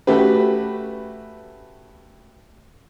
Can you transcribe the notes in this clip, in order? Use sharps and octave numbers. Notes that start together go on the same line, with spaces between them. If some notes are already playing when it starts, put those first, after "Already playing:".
A3 C#4 F#4 G4 B4